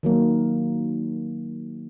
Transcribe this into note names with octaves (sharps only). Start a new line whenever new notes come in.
D#3 F#3 A#3